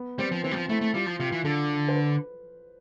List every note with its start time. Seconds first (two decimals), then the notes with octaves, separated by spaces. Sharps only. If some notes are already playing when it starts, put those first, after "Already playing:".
Already playing: B3
0.19 G3 C4
0.32 F3
0.44 E3 C4
0.51 G3
0.56 F3
0.69 A3 E4
0.81 A3
0.94 G3 F4
1.06 F3
1.19 C3 F4
1.32 E3
1.45 D3 A4
1.88 C5
1.95 B4